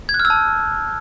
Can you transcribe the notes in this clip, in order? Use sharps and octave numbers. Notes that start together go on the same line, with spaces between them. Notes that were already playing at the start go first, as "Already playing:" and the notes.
G#6
F#6
F6
E6
A5